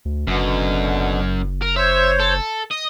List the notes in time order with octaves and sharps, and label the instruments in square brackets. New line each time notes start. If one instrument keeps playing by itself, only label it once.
[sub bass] D2
[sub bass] F#1 [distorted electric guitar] F#2 [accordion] B2 D3
[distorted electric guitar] A#4
[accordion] C5 C#5 [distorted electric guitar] E5
[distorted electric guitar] A4
[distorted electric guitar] D#5 [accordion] D#6